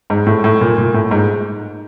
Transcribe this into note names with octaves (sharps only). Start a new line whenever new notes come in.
G#2
A2
A2
A#2
A#2
A2
G#2